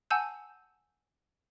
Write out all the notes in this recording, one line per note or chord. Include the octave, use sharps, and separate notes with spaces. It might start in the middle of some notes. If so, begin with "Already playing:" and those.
F#5 G#5 A5 E6 G6